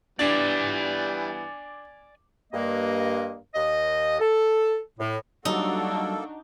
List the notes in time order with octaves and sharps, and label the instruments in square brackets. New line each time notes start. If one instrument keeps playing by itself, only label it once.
[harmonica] E3 G3 B3 [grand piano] D4 [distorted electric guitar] D5 G#5
[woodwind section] G2 A#3 D#5
D#2 D#5
A4
A2
[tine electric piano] F#3 G3 [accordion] A#3 A4 [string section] D4 F#4 [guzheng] D#4